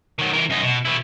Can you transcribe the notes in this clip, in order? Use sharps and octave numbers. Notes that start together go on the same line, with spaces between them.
D#3 F#3
E3 A#4
F#2 D#4
B2
B2 E4